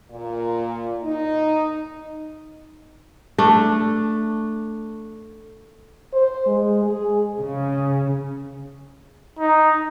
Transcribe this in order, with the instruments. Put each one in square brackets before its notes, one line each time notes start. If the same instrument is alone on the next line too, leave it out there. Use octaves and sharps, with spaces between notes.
[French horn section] A#2
D#4
[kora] A3 D4
[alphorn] C5
G#3
G#4
[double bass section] C#3
[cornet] D#4